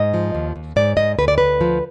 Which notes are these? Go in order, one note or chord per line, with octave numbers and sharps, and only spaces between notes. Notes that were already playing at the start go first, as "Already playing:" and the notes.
Already playing: G#2 D#5
F3
D#2
D#2
G#2 D5
G#2 D#5
D2 B4
D5
D2 B4
F3